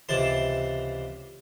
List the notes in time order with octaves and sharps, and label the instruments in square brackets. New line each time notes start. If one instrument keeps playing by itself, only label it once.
[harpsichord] C#2 C3 E3 A5 C6